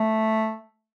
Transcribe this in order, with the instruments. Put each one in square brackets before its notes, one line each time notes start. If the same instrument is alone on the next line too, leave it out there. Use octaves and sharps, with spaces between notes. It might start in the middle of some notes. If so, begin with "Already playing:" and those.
Already playing: [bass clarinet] A3